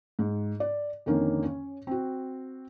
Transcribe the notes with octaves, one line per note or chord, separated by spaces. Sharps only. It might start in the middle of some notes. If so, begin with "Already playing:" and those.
G#2
D5
F2 D3 D#3 A#3 C#4
C#4 C#5
C4 F#4